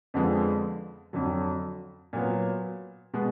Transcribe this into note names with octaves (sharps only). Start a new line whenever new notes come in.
F2 D3 F3 G#3 B3
F2 D3 F#3
A#2 F#3 B3
B2 G#3 B3